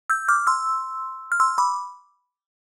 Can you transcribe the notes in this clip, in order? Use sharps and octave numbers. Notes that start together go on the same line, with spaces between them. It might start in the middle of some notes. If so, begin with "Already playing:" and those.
E6 G6
D6 F6
C6 E6
F6
C6 E6
B5 D6